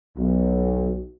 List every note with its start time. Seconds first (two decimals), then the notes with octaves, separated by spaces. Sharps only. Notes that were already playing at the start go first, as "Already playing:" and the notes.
0.18 B1